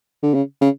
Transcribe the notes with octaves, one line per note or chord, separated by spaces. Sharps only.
D3
C#3
C#3